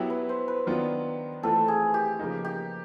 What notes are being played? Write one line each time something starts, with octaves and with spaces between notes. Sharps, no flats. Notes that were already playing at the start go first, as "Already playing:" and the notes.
Already playing: F#3 B3 E4 G4
B4
C5
B4
D#3 F#3 B3 D4 F4
E3 A3 C4 F4 A4
G#4
G4
C#3 F3 A#3 D#4
G4